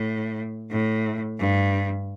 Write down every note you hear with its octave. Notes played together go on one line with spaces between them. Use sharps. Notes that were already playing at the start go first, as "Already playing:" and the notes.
Already playing: A2
A2
G2